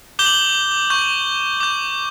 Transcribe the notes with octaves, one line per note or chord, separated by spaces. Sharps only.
D6 G6 G7
F#7
G7
C#6 G6
D6 G6